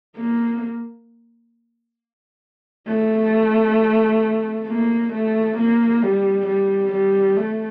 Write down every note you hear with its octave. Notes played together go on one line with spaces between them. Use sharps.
A#3
A3
A#3
A3
A#3
G3
G3
G3
A3